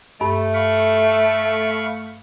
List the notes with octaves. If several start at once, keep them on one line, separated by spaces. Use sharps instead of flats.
G2 A3
F5 B5 C#6